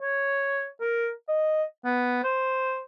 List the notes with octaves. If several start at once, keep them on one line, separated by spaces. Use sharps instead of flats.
C#5
A#4
D#5
B3
C5